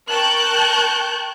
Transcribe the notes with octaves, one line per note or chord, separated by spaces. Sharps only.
A#4 G5 A5 C#6 F#6 G6